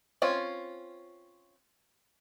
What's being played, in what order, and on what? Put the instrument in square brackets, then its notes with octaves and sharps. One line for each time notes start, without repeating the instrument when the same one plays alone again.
[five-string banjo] C4 C#4 F4 C#5